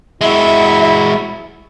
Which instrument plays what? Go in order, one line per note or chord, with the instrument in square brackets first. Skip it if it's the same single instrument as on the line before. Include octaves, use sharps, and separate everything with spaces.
[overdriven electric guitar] G#3 F#4 [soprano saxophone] E4 [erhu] E5